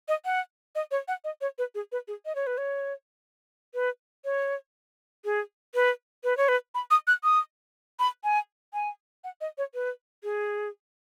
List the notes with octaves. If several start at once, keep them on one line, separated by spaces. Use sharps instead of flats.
D#5
F#5
D#5
C#5
F#5
D#5
C#5
B4
G#4
B4
G#4
D#5
C#5
B4
C#5
B4
C#5
G#4
B4
B4
C#5
B4
B5
D#6
F#6
D#6
B5
G#5
G#5
F#5
D#5
C#5
B4
G#4